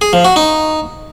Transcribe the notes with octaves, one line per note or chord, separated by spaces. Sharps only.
G#4
F3
F#4
D#4